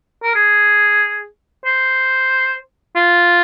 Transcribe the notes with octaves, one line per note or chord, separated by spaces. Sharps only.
A#4
G#4
C5
F4